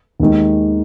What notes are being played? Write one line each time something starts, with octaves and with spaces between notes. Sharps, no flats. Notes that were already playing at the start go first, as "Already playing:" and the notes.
D#2 D#3 G#3